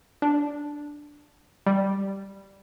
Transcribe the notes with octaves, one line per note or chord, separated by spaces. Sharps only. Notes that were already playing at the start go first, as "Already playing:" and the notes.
D4
G3